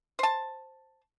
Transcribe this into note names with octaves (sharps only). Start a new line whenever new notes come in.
C5 A5